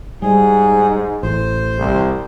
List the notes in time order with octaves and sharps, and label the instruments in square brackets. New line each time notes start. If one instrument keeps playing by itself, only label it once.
[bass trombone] G#2 [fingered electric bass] G3 [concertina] G#4
[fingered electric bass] A1 [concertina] C5
[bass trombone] C2